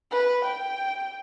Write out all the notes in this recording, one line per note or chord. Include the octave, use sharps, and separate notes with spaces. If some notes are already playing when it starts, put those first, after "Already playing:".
B4
G5